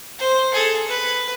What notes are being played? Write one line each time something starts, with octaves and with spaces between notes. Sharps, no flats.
C5
G#4 A4
B4